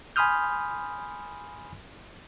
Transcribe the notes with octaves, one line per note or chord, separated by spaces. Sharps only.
G#5 B5 C6 D#6 F6 G6